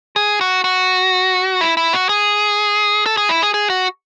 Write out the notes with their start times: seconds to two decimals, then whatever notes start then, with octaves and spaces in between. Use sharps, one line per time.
0.16 G#4
0.41 F#4
0.64 F#4
1.61 E4
1.77 E4
1.93 F#4
2.09 G#4
3.06 A4
3.17 G#4
3.29 E4
3.42 G#4
3.54 G#4
3.70 F#4